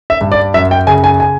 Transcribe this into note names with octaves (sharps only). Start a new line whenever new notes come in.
E5
G2
D5
F#2 E5
G5
C#3 G#5
G#5
G#5